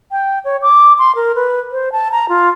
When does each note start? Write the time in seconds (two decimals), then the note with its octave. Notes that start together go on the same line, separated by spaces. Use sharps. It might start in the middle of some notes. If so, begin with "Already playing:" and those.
0.11 G5
0.45 C#5
0.62 D6
0.99 C6
1.16 A#4
1.35 B4
1.72 C5
1.92 A5
2.12 A#5
2.29 F4